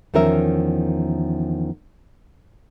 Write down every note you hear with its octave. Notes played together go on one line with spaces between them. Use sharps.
E2 D#3 F3 C#4 A#4 E5